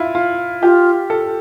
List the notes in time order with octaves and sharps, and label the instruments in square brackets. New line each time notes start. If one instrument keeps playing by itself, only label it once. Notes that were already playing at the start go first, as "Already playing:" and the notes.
Already playing: [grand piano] E4 F4
F4
[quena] F4 [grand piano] G4
[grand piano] A4